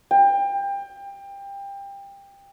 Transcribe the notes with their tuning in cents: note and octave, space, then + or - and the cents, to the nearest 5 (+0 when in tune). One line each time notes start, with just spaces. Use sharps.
G5 +25